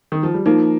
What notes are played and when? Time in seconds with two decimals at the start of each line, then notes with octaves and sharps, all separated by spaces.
0.12 D#3
0.23 F3
0.34 G3
0.45 F3 A#3 D#4